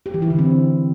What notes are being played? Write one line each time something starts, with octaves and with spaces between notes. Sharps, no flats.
G4
E3
E4
D3
C4